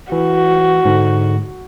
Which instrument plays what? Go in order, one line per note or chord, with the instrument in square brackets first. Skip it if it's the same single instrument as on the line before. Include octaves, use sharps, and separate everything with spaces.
[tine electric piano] E3 [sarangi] F#4
[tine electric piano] G#2 D3